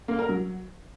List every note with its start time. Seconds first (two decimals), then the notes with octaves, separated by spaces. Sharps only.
0.08 A#3
0.19 A#4
0.29 F#3